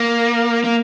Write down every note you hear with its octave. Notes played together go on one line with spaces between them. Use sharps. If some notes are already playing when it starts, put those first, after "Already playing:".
Already playing: A#3
A#3